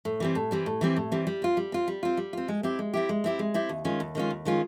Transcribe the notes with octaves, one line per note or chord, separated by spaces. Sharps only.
A2
E3 G3 C4
A2
E3 G3 C4
A2
E3 G3 C4
A2
E3 G3 C4
G3
C4 F4
G3
C4 F4
G3
C4 F4
G3
C4 F4
G#3
C4 E4 G4
G#3
C4 E4 G4
G#3
C4 E4 G4
G#3
C4 E4 G4
D#2
D#3 G#3 C#4 F4
D#2
D#3 G#3 C#4 F4
D#2
D#3 G#3 C#4 F4